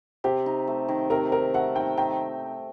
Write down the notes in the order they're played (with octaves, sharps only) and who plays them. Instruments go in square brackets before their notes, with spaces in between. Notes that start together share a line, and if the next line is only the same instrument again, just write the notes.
[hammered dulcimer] C3 [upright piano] G4
[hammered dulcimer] D#4
A3
D#3
[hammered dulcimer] C3 [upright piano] A#4
[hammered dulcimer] D#4 [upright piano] A#4
[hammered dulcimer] A3 [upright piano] F#5
[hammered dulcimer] D#3 [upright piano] G5
[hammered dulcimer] D#3 [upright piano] G5